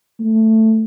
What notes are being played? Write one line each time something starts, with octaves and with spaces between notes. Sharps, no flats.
A3